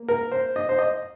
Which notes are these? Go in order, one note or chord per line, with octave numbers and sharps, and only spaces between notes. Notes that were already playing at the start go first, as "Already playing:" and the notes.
Already playing: A#3
A#4
C5
D#5
C5
D#5